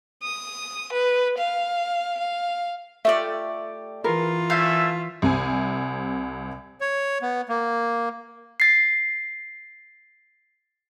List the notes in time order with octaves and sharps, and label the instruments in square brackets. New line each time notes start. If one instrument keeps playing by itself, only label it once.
[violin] D#6
B4
F5
F5
[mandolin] A3 G4 D5 [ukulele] F4 E5
[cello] E3 F4 [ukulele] G#4 A#4 B4
[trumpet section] A3 C#4 E5 [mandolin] F5 G6
[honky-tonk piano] C2 C3 G#5
[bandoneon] C#5
B3
A#3
[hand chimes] A6 C7